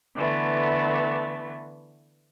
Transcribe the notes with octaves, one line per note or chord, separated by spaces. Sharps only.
D3 E3 A3 B3